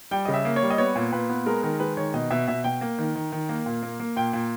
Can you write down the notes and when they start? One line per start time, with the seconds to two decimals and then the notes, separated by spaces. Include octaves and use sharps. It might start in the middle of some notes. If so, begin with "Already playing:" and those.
0.11 G3 G5
0.25 C#3 D#5
0.34 E5
0.45 A#3
0.56 C#5
0.62 G3
0.70 D#5
0.78 B3 C#5
0.95 A#2
1.12 A#2 B4
1.30 B3
1.46 G#3 A#4
1.63 D#3 A#4
1.80 G#3 B4
1.97 D#3 C#5
2.14 B2 D#5
2.31 B2 E5
2.48 B2 E5
2.64 B2 G5
2.81 A#3
2.98 D#3
3.15 D#3
3.32 D#3
3.49 A#3
3.66 A#2
3.83 A#3
4.00 A#3
4.16 A#2 G5
4.33 A#2